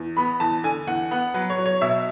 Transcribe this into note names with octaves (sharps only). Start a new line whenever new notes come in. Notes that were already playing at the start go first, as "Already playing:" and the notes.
Already playing: E2
B3 B5
E2 A5
D3 G#5
E2 F#5
B3 F#5
F#3 B4
C#5
F#3
C#5
B2 E5